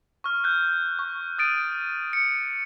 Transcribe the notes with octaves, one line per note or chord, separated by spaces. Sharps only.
C#6 F6
F#6 G6
C#6
D#6 A6 D7 D#7
C#7